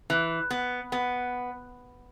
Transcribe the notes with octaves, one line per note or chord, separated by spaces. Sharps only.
E3
B3
B3